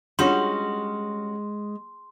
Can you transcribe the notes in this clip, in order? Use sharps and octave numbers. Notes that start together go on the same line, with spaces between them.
G3 G#3 C#4 D4 F4 F#4 C#5 C6